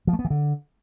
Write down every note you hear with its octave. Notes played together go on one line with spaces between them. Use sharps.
F3
A3
B3
E3
D3